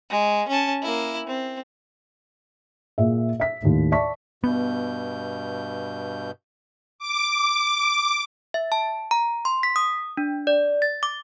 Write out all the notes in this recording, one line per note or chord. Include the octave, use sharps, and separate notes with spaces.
G#3
C#4 A5
A#3 E4
C4
A#2 G#4 E5
E5 B6
D#2 A2
D5 E5 A5 C#6 B6
G2 B2 B3 G6
D6
E5
A5
A#5
C6
B6
D#6
D4
D5
A6
D6